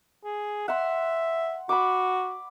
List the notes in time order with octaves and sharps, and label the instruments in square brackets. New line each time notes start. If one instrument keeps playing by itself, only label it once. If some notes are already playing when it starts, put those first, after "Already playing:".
[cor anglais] G#4
[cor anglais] E5 [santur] F#5 C6
[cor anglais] F#4 [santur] B5 D6